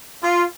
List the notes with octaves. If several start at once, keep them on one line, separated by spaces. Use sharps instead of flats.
F4